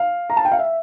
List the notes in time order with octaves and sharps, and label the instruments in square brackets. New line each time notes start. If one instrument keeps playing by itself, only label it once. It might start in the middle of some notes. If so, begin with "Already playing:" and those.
Already playing: [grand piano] F5
A#5
A5
G5
F5
E5